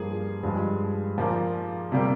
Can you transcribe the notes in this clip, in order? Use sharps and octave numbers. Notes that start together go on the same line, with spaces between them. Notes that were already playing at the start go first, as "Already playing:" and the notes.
Already playing: G2 F3 A#3 G#4
G2 F3 G#3
A#2 F3 A#3
C3 G3 A#3